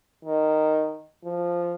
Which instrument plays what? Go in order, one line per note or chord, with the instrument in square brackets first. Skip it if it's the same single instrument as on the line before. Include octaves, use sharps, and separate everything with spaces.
[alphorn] D#3
F3